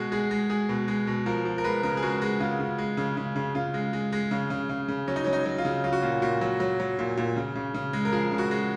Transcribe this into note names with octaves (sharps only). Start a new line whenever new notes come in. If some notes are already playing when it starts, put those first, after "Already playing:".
Already playing: B2 G#3 F#4
G#3 G#4
G#3
G#3 G#4
B2
G#3
B2
F3 A#4
F3
A#4
G#3 B4
C#3 A#4
G#4
G#3 F#4
G#3
C#3 F4
C#3
G#3
C#3
C#3
C#3
C#3 F4
G#3
G#3
G#3
C#3
C#3
C#3
C#3
F#3 C#4
D#4
F#3 C#4
D#4
F#3
F4
C#3
F#3 F4
F#4
A#2 F4
A#2 F#4
F#3
F#3
F#3
A#2
A#2
C#3
C#3
C#3
G#3
A#4
F3 G#4
C#3
F#4
G#3